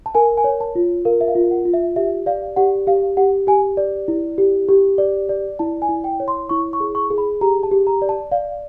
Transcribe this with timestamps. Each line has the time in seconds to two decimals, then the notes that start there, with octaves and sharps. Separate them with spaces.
0.06 A5
0.15 A#4 G#5
0.38 G#5
0.44 C#5
0.61 A5
0.75 F4
1.05 A#4 F5
1.21 E5
1.28 F5
1.35 F4
1.51 F#5
1.65 F4
1.74 E5
1.96 G4 E5
2.26 D5 F5
2.56 G4 F#5
2.87 G4 F5
3.17 G4 F#5
3.47 G4 G#5
3.77 D5
4.08 E4
4.38 G4
4.69 G4
4.98 D5
5.29 D5
5.59 E4 A5
5.82 G#5
5.89 E4
6.04 G5
6.20 C#5
6.28 C6
6.49 E4 C#6
6.73 C#6
6.80 G#4
6.95 C#6
7.11 G#4
7.18 B5
7.41 G4 A#5
7.63 A5
7.71 G4
7.87 A#5
8.02 D5
8.09 A5
8.31 D5 F5